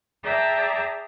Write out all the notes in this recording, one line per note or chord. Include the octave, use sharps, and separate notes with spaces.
G#4 D5 E5 G5 A5 A#5